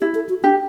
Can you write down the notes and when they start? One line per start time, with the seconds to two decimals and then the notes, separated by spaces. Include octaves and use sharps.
0.01 E4 G4
0.15 A4
0.29 F#4
0.44 D4 G4